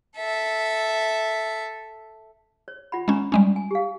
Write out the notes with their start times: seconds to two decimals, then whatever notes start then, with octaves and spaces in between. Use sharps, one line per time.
0.17 A4 E5
2.68 C#5
2.92 F4 F#5 B5
3.08 G#3 C#4 C#5 A#5 B5
3.32 G3 G#3 C#4
3.56 G#5
3.71 G4 F5